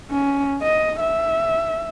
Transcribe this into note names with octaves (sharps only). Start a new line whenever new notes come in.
C#4
D#5
E5